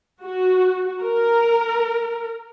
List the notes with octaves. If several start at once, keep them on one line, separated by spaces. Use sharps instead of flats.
F#4
A#4